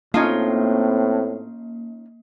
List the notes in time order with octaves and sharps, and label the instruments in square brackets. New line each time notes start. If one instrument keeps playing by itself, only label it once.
[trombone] A2 [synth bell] A#3 [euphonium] C4 [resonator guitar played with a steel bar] C#4 D#4 F4